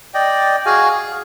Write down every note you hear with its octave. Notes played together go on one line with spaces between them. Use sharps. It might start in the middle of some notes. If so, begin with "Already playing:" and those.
D5 D#5 G5
F#4 G#4 F5 G#5
G#4